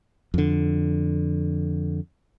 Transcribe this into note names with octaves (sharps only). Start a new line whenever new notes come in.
F2 D3